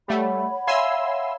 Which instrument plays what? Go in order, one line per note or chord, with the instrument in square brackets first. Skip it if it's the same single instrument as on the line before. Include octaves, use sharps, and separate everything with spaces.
[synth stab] G3 A3 [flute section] C#5 F#5 B5
[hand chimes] E5 F5 [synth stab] G#5 C6 E6